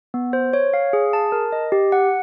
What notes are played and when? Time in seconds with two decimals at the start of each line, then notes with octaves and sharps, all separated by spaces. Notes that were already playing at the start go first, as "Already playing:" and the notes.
0.14 B3
0.33 C5
0.53 C#5
0.74 F5
0.93 G#4
1.13 A5
1.32 A#4
1.52 D#5
1.72 G4
1.92 F#5